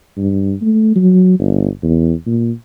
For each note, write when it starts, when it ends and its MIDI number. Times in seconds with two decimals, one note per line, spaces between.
0.17 0.53 43
0.61 0.91 57
0.96 1.38 54
1.39 1.68 31
1.82 2.13 40
2.26 2.51 46